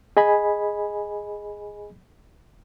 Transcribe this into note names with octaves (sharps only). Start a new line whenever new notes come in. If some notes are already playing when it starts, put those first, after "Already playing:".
G#4 D#5 G#5 B5